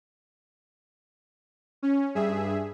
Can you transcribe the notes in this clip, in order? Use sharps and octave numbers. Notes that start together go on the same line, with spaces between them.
C#4
G2 G#4 E5